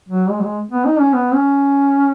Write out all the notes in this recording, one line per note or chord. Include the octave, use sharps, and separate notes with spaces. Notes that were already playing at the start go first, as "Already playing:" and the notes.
F#3
G#3
F#3
G#3
B3
D#4
C#4
B3
C#4